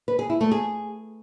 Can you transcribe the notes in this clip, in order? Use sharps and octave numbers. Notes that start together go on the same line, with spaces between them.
B4
G#4
E4
A3
G#4